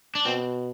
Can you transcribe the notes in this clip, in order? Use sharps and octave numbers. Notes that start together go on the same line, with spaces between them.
D4
B2 C4